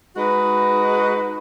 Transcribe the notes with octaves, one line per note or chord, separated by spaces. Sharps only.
G#3 D#4 F#4 B4